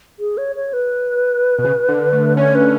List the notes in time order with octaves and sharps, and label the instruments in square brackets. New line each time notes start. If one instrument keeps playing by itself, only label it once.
[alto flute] G#4
C#5
C#5
B4
[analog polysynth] B2
C#3
D3
A3
[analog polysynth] C#4 [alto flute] C#5
[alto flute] B4